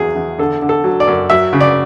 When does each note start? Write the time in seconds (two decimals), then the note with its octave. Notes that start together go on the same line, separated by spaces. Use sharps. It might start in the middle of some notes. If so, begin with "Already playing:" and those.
Already playing: E2 F#3 G#4
0.15 E2
0.38 D3 A4
0.62 D3
0.69 A4
0.84 F#3
1.00 D5
1.07 F#2
1.30 F#3 E5
1.53 C#3
1.61 D5